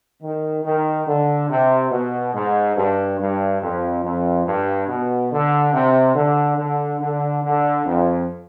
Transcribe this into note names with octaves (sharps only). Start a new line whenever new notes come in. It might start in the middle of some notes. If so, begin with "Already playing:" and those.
D#3
D#3
D3
C3
B2
G#2
G2
G2
F2
F2
G2
B2
D3
C3
D3
D3
D3
D3
F2